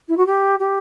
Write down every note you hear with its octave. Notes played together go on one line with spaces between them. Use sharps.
E4
F#4
G4
G4